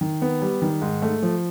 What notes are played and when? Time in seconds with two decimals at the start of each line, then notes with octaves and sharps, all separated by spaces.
0.01 D#3
0.22 B3
0.42 G3
0.62 D#3
0.81 G#2
1.02 A3
1.23 F3